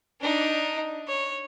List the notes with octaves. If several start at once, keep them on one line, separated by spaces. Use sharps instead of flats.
D4 D#4
C#5